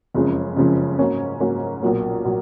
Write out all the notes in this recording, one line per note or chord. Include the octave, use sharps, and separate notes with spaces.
F#1 F2 C#3 F3 G#3
F#1 F2 C#3 F3 G#3
G#2 F#3 A#3 C#4
G#2 F#3 A#3 C#4
B1 A#2 F#3 A#3
A#2 F#3